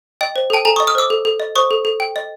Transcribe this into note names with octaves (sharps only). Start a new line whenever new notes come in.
D#5 G5
C5
A4 G5 A5
A4 G#5 A#5
D#5 C#6 D#6
D#6 F6
C5 D6 E6
A4
A4
D#5
C5 C#6 D#6
A4
A4
G5
D#5